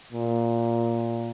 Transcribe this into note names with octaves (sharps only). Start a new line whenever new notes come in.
A#2